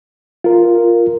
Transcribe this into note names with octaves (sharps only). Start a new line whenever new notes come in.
F4 A#4